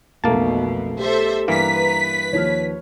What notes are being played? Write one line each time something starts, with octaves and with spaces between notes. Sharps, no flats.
B1 F2 B2 A3 A#3 A5
G4 A4 C5 E5
G2 E3 A#3 B4 A#5 B6
D#2 F3 C#5 F6